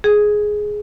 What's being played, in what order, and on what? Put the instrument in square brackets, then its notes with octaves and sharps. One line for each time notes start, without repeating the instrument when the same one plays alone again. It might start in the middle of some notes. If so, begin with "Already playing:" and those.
[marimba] G#4